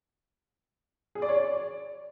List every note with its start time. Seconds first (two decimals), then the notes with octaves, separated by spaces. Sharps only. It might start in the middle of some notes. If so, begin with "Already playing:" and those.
1.15 G#4
1.22 D5
1.29 C#5
1.35 D5